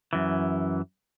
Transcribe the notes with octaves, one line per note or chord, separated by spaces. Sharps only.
F#2 E3